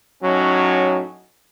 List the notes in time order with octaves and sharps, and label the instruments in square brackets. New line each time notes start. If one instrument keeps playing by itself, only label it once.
[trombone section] A2 F#3 C#4 D#4